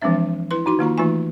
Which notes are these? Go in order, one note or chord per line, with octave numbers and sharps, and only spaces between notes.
E3 F3 G#3 C4 D4 E5
E4 B4 C6
D#4 F#4 C6
D#3 A#3 F4 A#5
E3 A3 D#4 F4 G#5